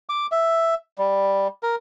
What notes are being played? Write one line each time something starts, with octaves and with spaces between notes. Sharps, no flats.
D6
E5
G3
A#4